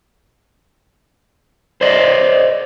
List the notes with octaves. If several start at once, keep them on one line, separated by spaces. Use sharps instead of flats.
C5 D5 D#5